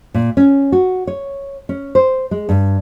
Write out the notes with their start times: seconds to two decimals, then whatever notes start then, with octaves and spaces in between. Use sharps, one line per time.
0.14 A#2
0.37 C#4
0.72 F#4
1.07 C#5
1.69 C#4
1.95 C5
2.31 G#3
2.49 G2